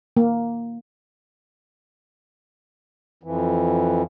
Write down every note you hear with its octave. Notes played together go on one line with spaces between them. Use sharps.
A#3
F2 E3